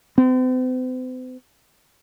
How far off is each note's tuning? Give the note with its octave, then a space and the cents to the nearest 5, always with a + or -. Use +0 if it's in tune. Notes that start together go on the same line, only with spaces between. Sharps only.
C4 -45